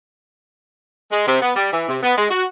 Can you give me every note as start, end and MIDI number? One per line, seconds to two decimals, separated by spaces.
1.11 1.27 56
1.27 1.39 48
1.42 1.51 59
1.56 1.72 55
1.72 1.84 52
1.88 1.98 48
2.03 2.15 59
2.17 2.29 56
2.30 2.44 66